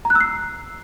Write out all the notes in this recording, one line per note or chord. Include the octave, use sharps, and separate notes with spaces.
A#5
F#6
E6
C7